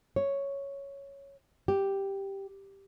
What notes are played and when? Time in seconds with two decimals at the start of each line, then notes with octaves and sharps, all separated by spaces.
0.16 C#5
1.68 G4